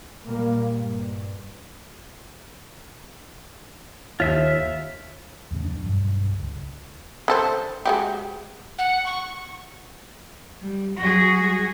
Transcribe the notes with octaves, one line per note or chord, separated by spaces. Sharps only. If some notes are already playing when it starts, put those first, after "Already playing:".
A#2 G3 A#3
G2
D#2 F4 E5 E6
E2 A2 C#3
F2 F3 D4
B1 G2
C#2
D3 A4 C5
G#3 F#4 G4
F#5
C#6
G3
F#3 F#4 G#4
G3